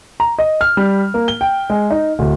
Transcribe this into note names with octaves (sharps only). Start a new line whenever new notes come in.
A#5
D#5
F6
G3
A#3
G7
G5
G#3
D#4
D1